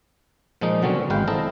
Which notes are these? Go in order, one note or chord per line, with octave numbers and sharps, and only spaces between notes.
A#2 F3 G#3 A#3 D#4
B2 D3 F#3 C4 C#4
G#1 G#3 B4 F5 G5
C4 E4 A4 D#5 A#5